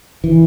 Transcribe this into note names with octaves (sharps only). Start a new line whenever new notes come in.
E3